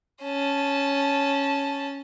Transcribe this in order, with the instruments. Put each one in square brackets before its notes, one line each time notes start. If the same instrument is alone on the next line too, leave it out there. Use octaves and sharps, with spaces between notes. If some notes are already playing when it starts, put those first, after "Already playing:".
[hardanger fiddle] C#4 A5